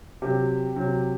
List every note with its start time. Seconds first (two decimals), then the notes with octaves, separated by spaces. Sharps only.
0.22 C3 F#3 G4
0.76 C3 F#3